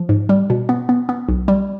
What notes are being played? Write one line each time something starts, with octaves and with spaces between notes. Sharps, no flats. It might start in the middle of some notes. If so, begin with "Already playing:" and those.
Already playing: F3
G#2
G3
B2
B3
B3
B3
B1
G3